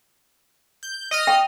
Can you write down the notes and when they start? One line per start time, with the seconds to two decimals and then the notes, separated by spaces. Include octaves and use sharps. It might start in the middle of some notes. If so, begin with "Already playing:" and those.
0.83 G6
1.11 D#5 D#6 F6
1.27 G5